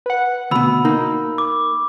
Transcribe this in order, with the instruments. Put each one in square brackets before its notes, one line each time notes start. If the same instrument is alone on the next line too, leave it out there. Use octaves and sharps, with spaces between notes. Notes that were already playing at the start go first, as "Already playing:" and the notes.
[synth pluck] B4 F#5
[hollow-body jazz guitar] D2 B2 [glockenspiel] B5 E6
[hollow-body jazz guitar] A#3 [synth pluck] D#4
[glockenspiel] D6